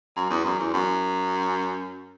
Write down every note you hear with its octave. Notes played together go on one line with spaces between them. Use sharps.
F#2
E2
F#2
E2
F#2